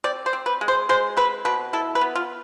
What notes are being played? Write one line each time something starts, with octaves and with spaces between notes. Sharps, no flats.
C4 D5
C5
C4
B4
G#3
C5
G#3 C5
C4 B4
B2 B4
E4 A4
B4
B3
F4